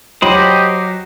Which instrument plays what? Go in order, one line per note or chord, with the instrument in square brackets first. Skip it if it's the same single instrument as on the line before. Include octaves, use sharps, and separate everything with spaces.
[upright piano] F#3 F#4 [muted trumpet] G4 [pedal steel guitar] C5 D#5 B5